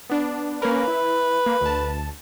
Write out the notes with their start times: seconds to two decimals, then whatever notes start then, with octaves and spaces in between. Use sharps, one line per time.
0.10 B3 D4
0.62 A#3 C#4 A#4 B4
0.88 E4
1.46 A#3
1.61 D2 A5